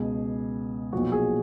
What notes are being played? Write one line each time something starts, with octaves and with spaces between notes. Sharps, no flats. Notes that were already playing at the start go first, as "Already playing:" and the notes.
Already playing: C#2 B2 G#4
B1 A#2 F3 F#4
G#4